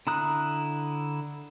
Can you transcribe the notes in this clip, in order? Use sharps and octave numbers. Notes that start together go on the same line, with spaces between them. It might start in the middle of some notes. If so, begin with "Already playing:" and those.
D3 E4 A#5 D#6 F#6